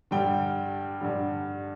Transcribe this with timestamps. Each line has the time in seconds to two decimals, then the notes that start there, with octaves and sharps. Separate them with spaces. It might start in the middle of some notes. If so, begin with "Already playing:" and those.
0.11 G2 D3 G3 G5
1.00 G2 D3 G3